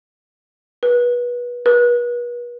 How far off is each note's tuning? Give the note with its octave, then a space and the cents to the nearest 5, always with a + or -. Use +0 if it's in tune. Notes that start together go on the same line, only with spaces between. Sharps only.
B4 -25
B4 -40